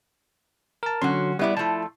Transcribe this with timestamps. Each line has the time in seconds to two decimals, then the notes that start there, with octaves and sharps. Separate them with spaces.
0.83 A#4 A5
1.02 D3 F#3 C#4 F#4 C6
1.39 G3 B3 E4 D5
1.57 F3 A3 E4 A5